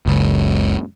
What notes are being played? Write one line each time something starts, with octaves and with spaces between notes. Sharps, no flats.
F#1 C#2